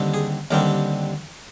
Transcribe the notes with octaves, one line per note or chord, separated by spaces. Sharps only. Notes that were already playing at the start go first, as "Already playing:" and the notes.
Already playing: D#2 D3 G3 C4
G#4
D#2 D3 G3 C4 A#4